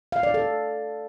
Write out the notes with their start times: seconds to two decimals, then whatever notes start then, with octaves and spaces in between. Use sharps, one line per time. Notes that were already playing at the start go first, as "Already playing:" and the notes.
0.12 F5
0.23 D5
0.34 A4